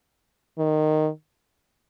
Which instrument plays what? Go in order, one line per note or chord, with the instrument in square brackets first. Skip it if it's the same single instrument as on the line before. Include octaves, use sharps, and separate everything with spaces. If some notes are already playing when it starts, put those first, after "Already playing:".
[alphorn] D#3